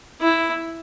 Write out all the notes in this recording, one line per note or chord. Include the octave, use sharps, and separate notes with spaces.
E4